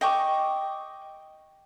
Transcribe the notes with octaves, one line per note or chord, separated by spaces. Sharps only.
D#5 G5 C#6 D6